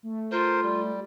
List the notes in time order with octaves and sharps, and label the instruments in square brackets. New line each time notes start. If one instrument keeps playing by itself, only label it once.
[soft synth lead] A3
[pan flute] F4 [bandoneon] A#4 C5
[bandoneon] G3